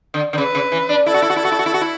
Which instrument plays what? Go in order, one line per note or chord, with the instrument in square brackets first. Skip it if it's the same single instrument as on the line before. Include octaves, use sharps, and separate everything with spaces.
[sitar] D3
D3
[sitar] C#3 [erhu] B4
[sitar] C#3
E3
D4
[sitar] E4 [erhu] A4
[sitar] F#4
E4
F#4
E4
[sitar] F#4 [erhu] A4
[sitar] E4
F#4
E4
F#4
E4